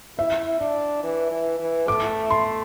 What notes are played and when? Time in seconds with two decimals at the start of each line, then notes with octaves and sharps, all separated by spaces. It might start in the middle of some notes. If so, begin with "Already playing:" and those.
0.18 E4 E5
0.60 D4
1.03 E3
1.31 E3
1.59 E3
1.88 A3 D6
2.30 C6